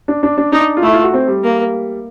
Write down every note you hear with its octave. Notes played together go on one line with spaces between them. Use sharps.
D4
D4
D4
D4 D#4
F4
A3 E4
F4
F#4
C4
G3
A#3